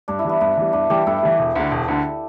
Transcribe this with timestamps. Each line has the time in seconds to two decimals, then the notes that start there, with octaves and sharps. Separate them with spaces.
0.08 G2 D4
0.19 E4
0.25 E3 G3 B3
0.41 G2 B3
0.57 E3 G3
0.73 G2 D4
0.90 E3 G3 D4 G4
1.06 G2 E4 A4
1.22 E3 G3
1.39 E1
1.56 D2 D3
1.71 E1
1.88 D2 D3